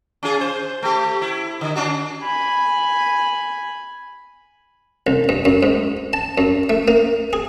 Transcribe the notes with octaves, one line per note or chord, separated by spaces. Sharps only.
C#4 F4 G#4
C5
A3 G4
E4
D3
C#4 D4 F#4
G#5 B5
C2
G2
F#2
G#2
A5
F#2
A3
A#3
G#4